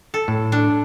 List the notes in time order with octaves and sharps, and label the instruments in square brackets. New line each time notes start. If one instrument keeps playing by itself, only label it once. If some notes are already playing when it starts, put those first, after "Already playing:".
[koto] A4
[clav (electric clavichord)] A2
[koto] D4